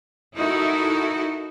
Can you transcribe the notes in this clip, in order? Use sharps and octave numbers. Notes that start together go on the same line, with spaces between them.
D#4 E4 F#4 A4 A#4